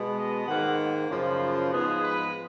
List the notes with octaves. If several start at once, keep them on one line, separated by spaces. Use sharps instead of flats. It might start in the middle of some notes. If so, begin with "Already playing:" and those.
Already playing: B2 G#3 B3
D#5
G#2 D#3 A#3 F#5
F#2 C#3 F3
G#2 F3 G#3 B3 G#4
B4